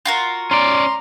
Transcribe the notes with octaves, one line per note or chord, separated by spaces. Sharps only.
F4 F#4 A#4
C#4 D5 A#5 C6